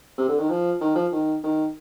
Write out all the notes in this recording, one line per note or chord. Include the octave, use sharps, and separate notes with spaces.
C3
D3
D#3
F3
D#3
F3
D#3
D#3